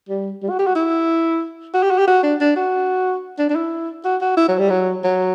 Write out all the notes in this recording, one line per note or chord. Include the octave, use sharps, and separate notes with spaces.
G3
G3
F#4
G4
F#4
E4
F#4
G4
F#4
G4
F#4
D4
D4
F#4
D4
D4
E4
F#4
F#4
E4
F#3
G3
F#3
F#3